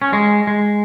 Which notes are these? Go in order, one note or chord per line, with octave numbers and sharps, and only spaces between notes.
C#4
G#3
G#3